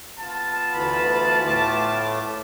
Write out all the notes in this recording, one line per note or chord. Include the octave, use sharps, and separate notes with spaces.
B3 F4 A5
D2 E3 B5
A2 A3 D6